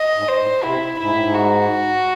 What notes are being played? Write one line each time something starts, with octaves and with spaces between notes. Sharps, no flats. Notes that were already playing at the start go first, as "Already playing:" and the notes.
Already playing: D#5
G#2
C5
A2
C3 E4
G#2 E4
A2
G#2
F#4